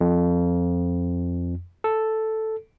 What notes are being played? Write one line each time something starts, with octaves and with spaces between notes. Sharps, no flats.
F2
A4